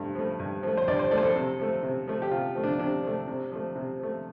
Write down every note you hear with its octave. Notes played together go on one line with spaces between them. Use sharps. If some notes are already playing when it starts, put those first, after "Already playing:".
Already playing: G2 F3 A3
F3 A3
G2
F3 A3
C5
G2 D5
C5
F3 A3 D5
C5
A4
C3
F3 A3
C3
F3 A3
G4
C3 F4
F3 A3
D4
C3 D4
F3 A3
C3
F3 A3
C3
F3 A3